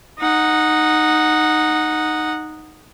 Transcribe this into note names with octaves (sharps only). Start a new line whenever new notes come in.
D#4 F#5